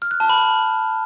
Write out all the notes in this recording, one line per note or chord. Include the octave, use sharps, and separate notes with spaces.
F6
F#6
A5
B5